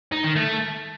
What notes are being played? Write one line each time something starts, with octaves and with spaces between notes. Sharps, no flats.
D#4
D#3
A3